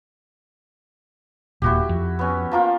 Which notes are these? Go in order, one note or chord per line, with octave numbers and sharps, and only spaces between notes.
D#1 A#2 E4 F#4 G4
F2
B3 C#4
F3 A#3 F4